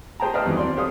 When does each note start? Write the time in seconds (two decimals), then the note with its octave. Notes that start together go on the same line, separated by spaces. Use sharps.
0.20 G4 G#4 C5 G5 A5 A#5
0.34 B4 D5 D#5 F5 A5 F6
0.45 E2 D#3 F#3 G3 C4
0.57 C4 D5 C6
0.77 G4 A4 C5 C#5 F5 D#6